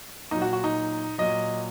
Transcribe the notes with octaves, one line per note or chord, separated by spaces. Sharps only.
A#2 F#3 D#4
F#4
F#4
D#4
A#2 F#3 D#5